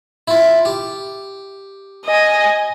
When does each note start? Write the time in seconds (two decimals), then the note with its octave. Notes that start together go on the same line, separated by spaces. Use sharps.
0.28 E4 F4
0.65 G4
2.06 D#5 G#5